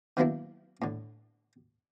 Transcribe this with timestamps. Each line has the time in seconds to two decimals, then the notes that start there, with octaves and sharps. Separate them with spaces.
0.17 D#3 F#3 A#3 B3 D4 E4
0.82 A2 D3